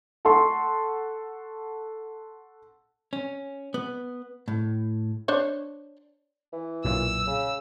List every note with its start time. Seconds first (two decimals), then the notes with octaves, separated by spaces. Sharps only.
0.25 A4 F#5 A5 C6 C#6
3.13 C#4
3.74 B3
4.48 A2
5.28 D4 C5 C#5
6.53 E3
6.85 B1 F#2 A#2 E6
7.27 C#3